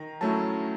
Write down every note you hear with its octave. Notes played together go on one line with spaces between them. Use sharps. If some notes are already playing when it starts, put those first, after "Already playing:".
Already playing: D#3 A#5
F#3 A3 C#4 E4 A5